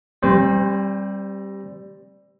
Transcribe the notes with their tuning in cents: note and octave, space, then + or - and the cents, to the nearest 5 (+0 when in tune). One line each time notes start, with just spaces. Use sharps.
G3 +0 C4 +35 C5 -30